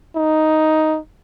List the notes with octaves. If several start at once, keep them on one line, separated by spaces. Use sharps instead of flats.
D#4